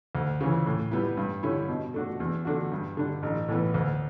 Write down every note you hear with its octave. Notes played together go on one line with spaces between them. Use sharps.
D2
C#3 E3
A2
G3 B3 E4
G2
D3 G3 C#4 E4
B2
A3 D4 F#4
E2
D3 A3 D4 F#4
G2
D3 G3 D4
A1
A2 E3 B3
D2